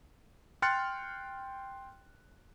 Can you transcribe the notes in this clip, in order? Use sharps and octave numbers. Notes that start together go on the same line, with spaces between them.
G5 C6 F6 F#6 A6 C#7